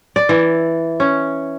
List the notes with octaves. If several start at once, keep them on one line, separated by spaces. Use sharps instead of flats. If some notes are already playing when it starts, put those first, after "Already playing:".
D5
E3
C#4